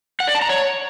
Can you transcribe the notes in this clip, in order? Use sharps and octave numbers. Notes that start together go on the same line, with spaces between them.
F#5
D5
A5
A#5
C#5